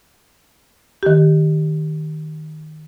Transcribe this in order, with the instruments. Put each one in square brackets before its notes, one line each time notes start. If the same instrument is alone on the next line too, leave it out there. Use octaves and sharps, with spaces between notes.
[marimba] D#3 G4